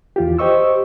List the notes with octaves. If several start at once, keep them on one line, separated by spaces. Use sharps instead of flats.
E2 F4 G4
G4 C5 D#5 C#6 E6